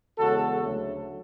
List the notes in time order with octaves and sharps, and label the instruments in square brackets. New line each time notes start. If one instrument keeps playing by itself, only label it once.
[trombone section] E2 C#3 G#3 F#4 A4
D2 C#3 F#3 A3